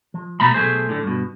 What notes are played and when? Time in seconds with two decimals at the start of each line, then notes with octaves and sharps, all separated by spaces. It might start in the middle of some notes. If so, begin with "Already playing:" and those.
0.14 F3
0.40 B2 A3 A#5 B5
0.54 B1 G2 A3 G#4 C5
0.89 A2 D3
1.03 G2 B2